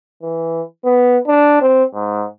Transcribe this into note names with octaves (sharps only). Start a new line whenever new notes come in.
E3
B3
D4
C4
G#2